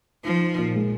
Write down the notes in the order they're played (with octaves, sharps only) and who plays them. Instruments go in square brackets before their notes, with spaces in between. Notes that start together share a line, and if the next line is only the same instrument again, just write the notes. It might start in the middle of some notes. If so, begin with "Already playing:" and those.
[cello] F3 [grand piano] D#4
[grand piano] D#4
A#2
G#3